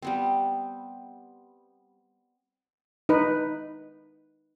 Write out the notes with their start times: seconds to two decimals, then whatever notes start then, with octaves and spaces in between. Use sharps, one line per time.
0.02 G3 B3 C4
3.09 D#4 B4